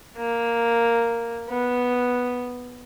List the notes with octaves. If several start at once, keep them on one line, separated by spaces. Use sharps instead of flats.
A#3
B3